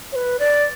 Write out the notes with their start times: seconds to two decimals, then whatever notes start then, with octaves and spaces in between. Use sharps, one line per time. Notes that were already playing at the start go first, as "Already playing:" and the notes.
0.12 C#5
0.16 B4
0.39 D5